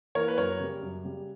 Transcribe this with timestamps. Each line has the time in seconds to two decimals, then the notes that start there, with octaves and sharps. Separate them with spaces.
0.15 E3 A#3 A#4 C#5
0.28 B4
0.37 F#2 A#4 C#5
0.60 C#3 G3
0.83 F#2
1.05 C#3 G3